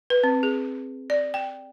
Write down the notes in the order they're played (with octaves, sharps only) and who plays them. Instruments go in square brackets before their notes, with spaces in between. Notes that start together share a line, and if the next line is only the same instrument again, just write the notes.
[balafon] B4
C4
G#4
D5
G5